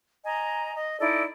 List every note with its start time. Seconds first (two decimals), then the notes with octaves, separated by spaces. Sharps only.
0.25 D#5 G#5 A#5
0.75 D#5
1.00 D#4 E4 A4 D5